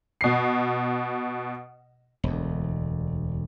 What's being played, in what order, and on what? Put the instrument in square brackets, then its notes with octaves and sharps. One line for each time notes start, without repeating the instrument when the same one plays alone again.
[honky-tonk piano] B2 C7
[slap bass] E1 D2